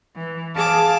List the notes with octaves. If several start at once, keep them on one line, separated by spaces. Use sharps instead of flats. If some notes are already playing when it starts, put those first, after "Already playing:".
E3
G#4 F5 A5 D6